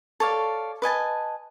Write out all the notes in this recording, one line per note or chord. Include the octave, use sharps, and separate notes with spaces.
A4 C#5 D5 F5
B4 D#5 G#5 A5